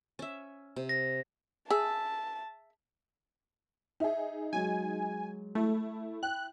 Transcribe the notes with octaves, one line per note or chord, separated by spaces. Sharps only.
C#4 E5
C3
A#6
G#4 E5 A5
D#4 G#4 E5
F#3 G#3 G#5
A3 E4
G5 F#6